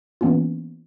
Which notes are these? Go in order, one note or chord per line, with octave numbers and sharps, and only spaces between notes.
E3 A#3 B3 C#4 D4 F4